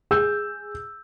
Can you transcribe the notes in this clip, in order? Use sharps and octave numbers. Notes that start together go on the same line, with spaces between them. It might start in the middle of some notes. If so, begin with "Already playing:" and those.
G#4 E6 G6